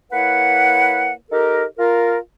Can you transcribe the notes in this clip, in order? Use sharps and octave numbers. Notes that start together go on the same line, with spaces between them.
A#3 E4 B4 C#5 F#5
D#4 G4 A4 A#4
F4 A#4